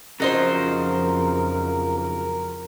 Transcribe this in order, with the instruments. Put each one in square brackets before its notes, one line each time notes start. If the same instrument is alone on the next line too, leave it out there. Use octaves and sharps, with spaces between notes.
[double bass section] F2 [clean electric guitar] C#3 F3 [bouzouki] F#3 D#4 C5 [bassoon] A#4
[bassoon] A#4